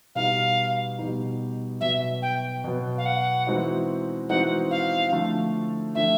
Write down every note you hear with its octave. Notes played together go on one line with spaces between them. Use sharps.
B2 G3 B3 D#4 F5
B2 G3 B3 D#4
B2 F#3 B3 E5
G5
B2 F#3 B3
F5
F#5
E3 G#3 C4 D#4 F#4
E3 G#3 C4 D#4 F#4 F#5
F5
D3 F3 A3
D3 F3 A3 E5